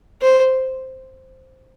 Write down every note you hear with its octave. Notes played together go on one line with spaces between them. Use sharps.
C5